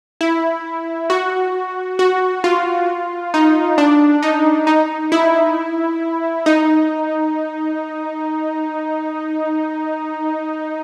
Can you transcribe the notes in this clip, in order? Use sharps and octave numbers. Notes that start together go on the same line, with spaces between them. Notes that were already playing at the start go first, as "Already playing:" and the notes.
E4
F#4
F#4
F4
D#4
D4
D#4
D#4
E4
D#4